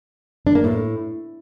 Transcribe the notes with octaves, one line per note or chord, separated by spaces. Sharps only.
D4
A#3
A2